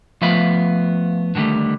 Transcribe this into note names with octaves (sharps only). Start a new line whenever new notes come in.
F3 A3 B3 E5 F5 B5
D3 D#3 F#3 G3 A3